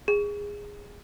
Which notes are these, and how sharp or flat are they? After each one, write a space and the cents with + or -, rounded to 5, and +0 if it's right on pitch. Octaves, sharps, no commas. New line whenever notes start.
G#4 -15